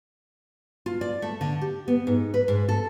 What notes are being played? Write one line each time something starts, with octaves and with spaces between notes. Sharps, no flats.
F4
D5
A3
D3
G4
B3
G#2
B4
G#2
A4